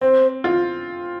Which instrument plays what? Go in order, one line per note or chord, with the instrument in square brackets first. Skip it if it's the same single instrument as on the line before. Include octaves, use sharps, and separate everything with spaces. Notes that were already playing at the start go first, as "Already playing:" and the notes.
[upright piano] C4 [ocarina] C5
[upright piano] F4